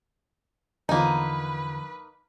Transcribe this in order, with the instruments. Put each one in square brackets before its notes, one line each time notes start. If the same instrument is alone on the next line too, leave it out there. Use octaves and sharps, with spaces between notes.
[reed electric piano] E2 D3 F3 [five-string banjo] A#3 D#4 [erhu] B4